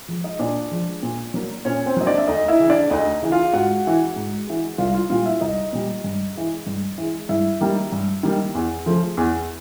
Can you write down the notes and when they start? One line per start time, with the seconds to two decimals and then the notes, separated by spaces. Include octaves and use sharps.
0.08 F3 G#3
0.24 D#4 D#5
0.39 A#2 D4 D5
0.71 F3 G#3
1.03 A#2
1.34 F#3 A#3
1.65 A#2 C#4 C#5
1.86 C4 C5
1.97 F#3 A#3 D#5
2.07 D4 D5
2.18 E5
2.27 D2 D#4 D#5
2.48 E4 E5
2.59 C#3 E3
2.70 D4 D5
2.90 D2 D#4 D#5
3.22 C#3 E3
3.32 F4 F5
3.54 G#2 F#4 F#5
3.85 E3 G#3
4.16 G#2
4.47 E3 G#3
4.78 C2 F4 F5
4.94 F4 F5
5.10 A#2 G3 F4 F5
5.25 E4 E5
5.41 C2 D#4 D#5
5.73 A#2 G3
6.04 G2
6.35 E3 G#3
6.67 G2
6.98 E3 G#3
7.29 G2 E4 E5
7.61 D#3 G3 A#3
7.92 G2
8.23 D#3 G3 A#3
8.55 E2
8.86 C#3 F3 A3
9.17 E2